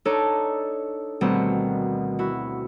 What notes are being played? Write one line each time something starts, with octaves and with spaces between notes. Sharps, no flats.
D4 D#4 A4 C#5
D2 B2 D#3 G3 C4 F#5
E4 F#4